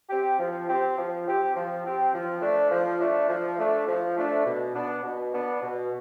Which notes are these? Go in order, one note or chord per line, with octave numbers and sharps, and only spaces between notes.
C4 G4
F3
C4 G4
F3
C4 G4
F3
C4 G4
F3
A3 D4
F3
A3 D4
F3
A3 D4
F3
A3 D4
B2
B3 D4
B2
B3 D4
B2